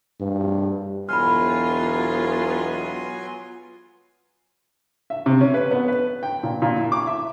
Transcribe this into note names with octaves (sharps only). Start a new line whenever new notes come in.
G2
E1 F#3 B3 F4 G#5 B5 C6 F6
E5
C3
C#4
B4
B3
B4
G5
A#2
A#2
E4
D6
E5